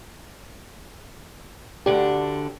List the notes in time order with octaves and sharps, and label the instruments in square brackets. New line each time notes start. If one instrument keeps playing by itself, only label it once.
[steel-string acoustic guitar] D2 D3 D4 [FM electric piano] G4